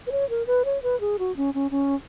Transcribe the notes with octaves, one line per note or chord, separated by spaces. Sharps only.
B4
C#5
A#4
B4
C#5
B4
G#4
F#4
C#4
C#4
C#4